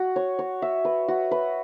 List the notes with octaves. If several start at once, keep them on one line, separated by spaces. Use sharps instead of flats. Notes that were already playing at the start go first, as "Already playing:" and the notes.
Already playing: F#4
C#5
C#5
E5
B4
F#4
B4